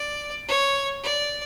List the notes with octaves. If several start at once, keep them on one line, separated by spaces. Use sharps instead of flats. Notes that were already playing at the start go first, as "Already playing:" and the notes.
Already playing: D5
C#5
D5